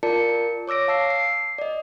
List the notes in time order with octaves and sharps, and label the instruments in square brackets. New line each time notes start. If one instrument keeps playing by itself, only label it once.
[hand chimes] F4 A#4 D5 A5 C#7
C#5 D6 E6 A#6 D7
F5 A5 E6 C7
C7
D5 D#5